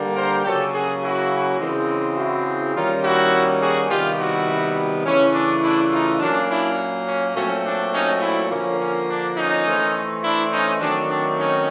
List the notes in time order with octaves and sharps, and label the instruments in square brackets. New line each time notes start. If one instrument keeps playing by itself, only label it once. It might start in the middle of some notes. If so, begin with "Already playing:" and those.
Already playing: [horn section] D3 G3 A#3
A#4 C5
C#3 F#3 A#3 C#4 G4 A4
F#4 G#4
E4 F#4
C#3 E3 G#3 C4
E4 F#4
D#3 G3 A#3 C#4 D#4 F4
E4 F#4
F#4 G#4
C3 D#3 G3 B3 F4 G4
E4 F#4
C#3 E3 A3 C#4
D4
D4 E4
D#4 F4
A#2 F#3 A#3 C#4 D4
D4 E4
C#4
A#2 F#3 A3 C4 C#4
D4
C#4 D#4
D4 E4
D3 F3 A#3 C#4
C#4
D4
C#4 D#4
E3 A3 C4
D4 E4
C#4 D#4
D#3 F#3 A3 C4 D4
D4
C#4 D#4